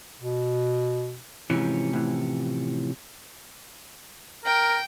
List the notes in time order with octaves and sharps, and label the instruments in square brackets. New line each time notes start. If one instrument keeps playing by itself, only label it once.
[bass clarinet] B2
[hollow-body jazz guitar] G#2 E3 [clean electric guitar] C3 F3 C#4
[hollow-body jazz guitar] A2 E3
[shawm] A#4 [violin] G5